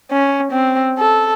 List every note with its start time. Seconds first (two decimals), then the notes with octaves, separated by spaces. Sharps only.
0.11 C#4
0.52 C4
0.98 A4